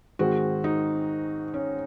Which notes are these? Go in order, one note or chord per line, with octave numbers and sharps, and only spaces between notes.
G#2 D#3 G#3 C4 F#4
D#4
C#4